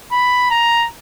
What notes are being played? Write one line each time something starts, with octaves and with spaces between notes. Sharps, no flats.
B5
A#5